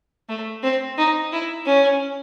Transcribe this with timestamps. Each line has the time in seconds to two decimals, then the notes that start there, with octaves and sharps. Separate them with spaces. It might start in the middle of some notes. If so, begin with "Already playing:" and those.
0.29 A3
0.63 C4
0.98 D#4
1.32 E4
1.66 C#4